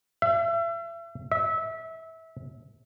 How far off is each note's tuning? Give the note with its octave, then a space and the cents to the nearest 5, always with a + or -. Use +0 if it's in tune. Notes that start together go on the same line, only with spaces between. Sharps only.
E5 +35
E5 -25